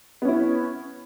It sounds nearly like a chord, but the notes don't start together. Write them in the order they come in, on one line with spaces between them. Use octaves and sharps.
B3 C#4 E4